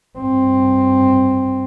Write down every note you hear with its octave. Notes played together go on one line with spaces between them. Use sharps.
G2 C4